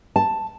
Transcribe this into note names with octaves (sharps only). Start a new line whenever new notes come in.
A5